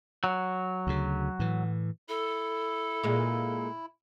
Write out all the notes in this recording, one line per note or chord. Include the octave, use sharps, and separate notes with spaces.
F#3
D2 C#3
A2 E3
E4 A4
A#2 G#3